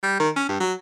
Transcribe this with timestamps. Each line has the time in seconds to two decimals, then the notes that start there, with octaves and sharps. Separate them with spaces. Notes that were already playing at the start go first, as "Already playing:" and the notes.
0.03 G3
0.20 D#3
0.36 C#4
0.49 G2
0.60 F#3